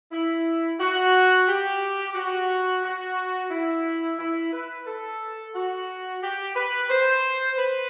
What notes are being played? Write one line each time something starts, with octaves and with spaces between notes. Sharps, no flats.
E4
F#4
G4
F#4
F#4
E4
E4
B4
A4
F#4
G4
B4
C5
B4